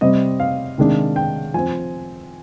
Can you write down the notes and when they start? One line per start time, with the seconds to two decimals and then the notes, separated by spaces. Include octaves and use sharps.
0.01 C3 G3 C4 D#5
0.40 F5
0.78 C3 D#3 G#3 D4
1.16 G5
1.54 F3 C4 G#5